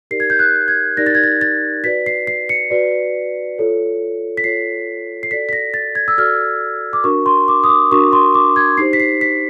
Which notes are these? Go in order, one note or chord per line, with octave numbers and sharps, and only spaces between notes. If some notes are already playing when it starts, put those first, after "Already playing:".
D#4 G4 A#4 D5 C7
G#6
G6
F#6
G#6
D#4 G4 A#4 D5 A#6
A6
G#6
A6
A6
F#4 B4 D5 B6
C7
C7
C#7
F#4 B4 D5
F4 A4 C#5
B6
F4 A4 C#5 C7
C7
F#4 A4 D5 B6
B6
A#6
A6
G#6
E6
F#4 A4 D5 F6
D6
D4 F#4 A#4 C#6
C6
D6
D#6
D6
D4 F#4 A#4 C#6
C6
D6
G#6
D#4 G4 C5 C7
B6
C7
B6